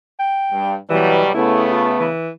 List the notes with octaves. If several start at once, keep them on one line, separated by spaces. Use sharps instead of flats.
G5
G2
B2 E3 F#3 G3
C#3 A3 B3 E4
F4
E3